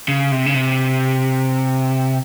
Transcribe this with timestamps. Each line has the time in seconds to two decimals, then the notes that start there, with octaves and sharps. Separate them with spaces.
0.08 C#3
0.32 C3
0.46 C#3
0.54 C3